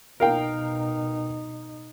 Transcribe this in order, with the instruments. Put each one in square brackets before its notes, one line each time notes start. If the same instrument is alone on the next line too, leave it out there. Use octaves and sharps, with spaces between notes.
[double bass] B2 D#4 [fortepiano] A#4 F5 G5